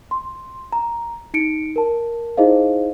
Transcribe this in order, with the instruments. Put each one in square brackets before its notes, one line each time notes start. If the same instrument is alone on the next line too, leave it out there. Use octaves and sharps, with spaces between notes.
[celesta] C6
A#5
D#4 C#7 D7
A#4 A5
D#4 E4 G#4 C5 D#5 F5